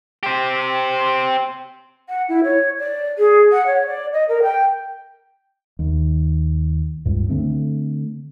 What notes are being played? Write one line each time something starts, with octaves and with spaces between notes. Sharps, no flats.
G4 C5
F#5
E4
C#5
D5
G#4
F#5
C#5
D5
D#5
A#4
G5
D#2
C#2 G2
D3 A3 C4